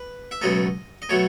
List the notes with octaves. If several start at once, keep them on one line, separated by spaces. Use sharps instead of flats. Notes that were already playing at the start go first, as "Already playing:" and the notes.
Already playing: B4
E5
C#2 B2 F#3 A3 D#5
D#5
B2 F#3 A3 C#5